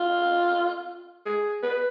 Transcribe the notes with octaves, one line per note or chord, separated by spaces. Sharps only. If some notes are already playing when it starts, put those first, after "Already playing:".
Already playing: F4
G#4
B4